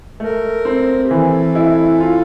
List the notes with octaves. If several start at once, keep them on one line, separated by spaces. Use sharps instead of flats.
A3 A#4
C4
G4
E3 A4
E4
F4